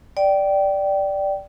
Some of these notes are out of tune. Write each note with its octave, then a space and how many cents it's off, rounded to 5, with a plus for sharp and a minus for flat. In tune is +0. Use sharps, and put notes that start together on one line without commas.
D5 +0 G5 -15